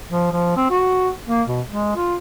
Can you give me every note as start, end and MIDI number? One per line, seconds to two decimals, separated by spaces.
0.09 0.30 53
0.32 0.53 53
0.57 0.70 60
0.70 1.09 66
1.29 1.42 58
1.48 1.61 47
1.69 1.93 56
1.96 2.15 65